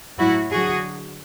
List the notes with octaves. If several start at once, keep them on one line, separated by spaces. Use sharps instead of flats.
A2 F#3 E4 F#4
D3 F#3 F#4 G#4